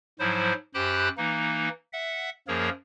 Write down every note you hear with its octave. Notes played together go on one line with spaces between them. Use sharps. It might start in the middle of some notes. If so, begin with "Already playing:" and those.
G#2 F3 F#3 E4 C5
F#2 G4 C5 G5 B5 F#6
E3 A#3 D#4
E5 F#5
F#2 F3 A#3 G#4 A#4 C#5